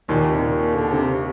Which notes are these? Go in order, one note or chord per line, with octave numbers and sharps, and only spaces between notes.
D#2 A#2 D#3
C3
A#2
D3
C3